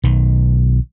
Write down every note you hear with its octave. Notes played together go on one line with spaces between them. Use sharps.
B1 D#3